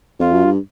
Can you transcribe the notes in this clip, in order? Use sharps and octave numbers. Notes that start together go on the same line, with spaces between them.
F2 F4
F#2
G2